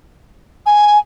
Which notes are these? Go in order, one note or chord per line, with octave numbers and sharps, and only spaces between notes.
G#5